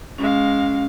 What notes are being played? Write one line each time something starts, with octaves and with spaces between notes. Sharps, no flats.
G#3 C#4 F5